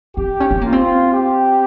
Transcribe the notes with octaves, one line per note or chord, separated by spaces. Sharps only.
C4 G4
C#4
C4
A#3 F4
C4
G4